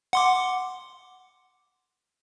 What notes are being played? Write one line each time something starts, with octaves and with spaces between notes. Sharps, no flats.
F#5 C6 D6